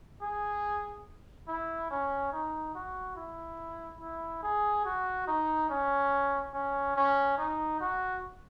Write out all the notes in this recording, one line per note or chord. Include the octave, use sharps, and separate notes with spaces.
G#4
E4
C#4
D#4
F#4
E4
E4
G#4
F#4
D#4
C#4
C#4
C#4
D#4
F#4